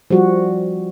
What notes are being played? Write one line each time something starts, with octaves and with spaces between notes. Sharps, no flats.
F3 G3 F#4